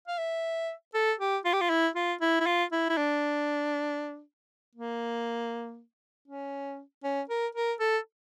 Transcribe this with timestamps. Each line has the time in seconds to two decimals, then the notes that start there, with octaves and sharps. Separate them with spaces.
0.08 F5
0.18 E5
0.94 A4
1.19 G4
1.45 F4
1.53 G4
1.61 F4
1.70 E4
1.95 F4
2.21 E4
2.40 E4
2.46 F4
2.72 E4
2.89 E4
2.97 D4
4.75 A#3
6.28 C#4
7.04 C#4
7.29 A#4
7.55 A#4
7.80 A4